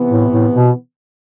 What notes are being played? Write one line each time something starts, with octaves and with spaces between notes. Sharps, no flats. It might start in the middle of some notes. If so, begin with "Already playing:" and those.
Already playing: C3 E3 B3
A2
A2
B2